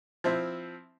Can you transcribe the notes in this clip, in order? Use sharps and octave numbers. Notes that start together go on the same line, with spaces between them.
F3 C4 E4